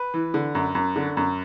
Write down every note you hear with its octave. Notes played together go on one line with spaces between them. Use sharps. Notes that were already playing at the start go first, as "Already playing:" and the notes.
Already playing: B4
E3
D3
F#2
F#2
D3
F#2